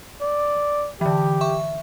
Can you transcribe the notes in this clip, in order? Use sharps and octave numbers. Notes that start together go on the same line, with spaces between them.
D5
D3 E3 G4
E5 C#6